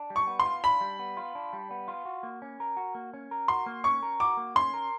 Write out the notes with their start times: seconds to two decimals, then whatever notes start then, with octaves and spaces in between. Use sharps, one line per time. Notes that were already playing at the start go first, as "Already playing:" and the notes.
Already playing: D4
0.10 G3
0.16 C#6
0.27 B3
0.39 C6
0.46 F4
0.64 D4 B5
0.81 G3
0.99 B3
1.17 F4
1.35 D4
1.53 G3
1.71 B3
1.88 F4
2.05 F#4
2.23 A#3
2.42 C#4
2.60 A#4
2.77 F#4
2.95 A#3
3.14 C#4
3.31 A#4
3.48 F#4 C6
3.66 A#3
3.84 C#4 C#6
4.03 A#4
4.20 F#4 D6
4.37 A#3
4.56 C#4 C6
4.74 A#4